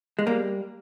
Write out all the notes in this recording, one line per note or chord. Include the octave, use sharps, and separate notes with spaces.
G#3
G3 A#3